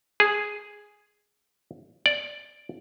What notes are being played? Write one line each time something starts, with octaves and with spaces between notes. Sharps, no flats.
G#4
D5